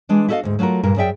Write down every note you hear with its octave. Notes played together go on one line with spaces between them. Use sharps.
E3 G#3 D4
E4 F#4 A4 C5 D#5 F5
D2 G#2
F#3 A3 F4 F#4 A#4
G2 A#2 A#4
F#2 F#3 G#4 D5 E5 G5